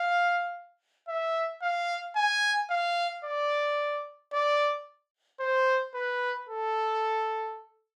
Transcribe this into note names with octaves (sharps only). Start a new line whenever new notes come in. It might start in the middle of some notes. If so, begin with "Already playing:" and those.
Already playing: F5
E5
F5
G#5
F5
D5
D5
C5
B4
A4